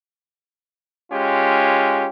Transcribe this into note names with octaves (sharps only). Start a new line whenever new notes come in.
G#3 C#4 F4 G4